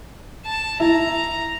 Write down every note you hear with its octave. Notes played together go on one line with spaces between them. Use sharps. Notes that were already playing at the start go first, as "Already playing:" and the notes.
A5
E4 A#5